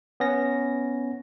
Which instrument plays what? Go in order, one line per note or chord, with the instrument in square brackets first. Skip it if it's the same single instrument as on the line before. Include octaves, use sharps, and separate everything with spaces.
[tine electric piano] B3 C#4 A#6